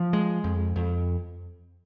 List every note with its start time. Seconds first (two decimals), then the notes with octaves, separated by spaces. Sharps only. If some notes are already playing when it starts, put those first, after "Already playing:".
Already playing: F3
0.13 G#3
0.44 F2
0.76 F2